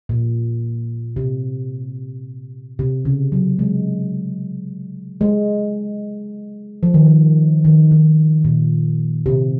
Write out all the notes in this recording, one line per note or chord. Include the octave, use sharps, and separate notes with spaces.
A#2
C3
C3
C#3
F#3
G#3
G#3
F3
D#3
F3
D#3
D#3
A#2
C3